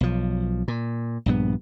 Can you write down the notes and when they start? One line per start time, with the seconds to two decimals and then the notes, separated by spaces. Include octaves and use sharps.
0.01 B1 F3
0.68 A#2
1.26 A#1 G2 B3